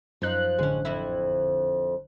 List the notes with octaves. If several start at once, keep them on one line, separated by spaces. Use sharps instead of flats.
F#2 F3 D#4 F#6
A1 D3 G#3 C#4
F2 E4